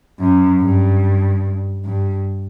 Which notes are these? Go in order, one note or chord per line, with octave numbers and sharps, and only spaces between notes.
F#2
G2
G2